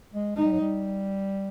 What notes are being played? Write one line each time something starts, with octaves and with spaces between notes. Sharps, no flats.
G#3
G#3 D#4
G3
F#3
G3